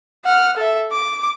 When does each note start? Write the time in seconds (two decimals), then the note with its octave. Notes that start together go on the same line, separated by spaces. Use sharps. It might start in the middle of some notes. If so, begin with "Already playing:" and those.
0.25 F#5 F6
0.57 A4 E5
0.91 D6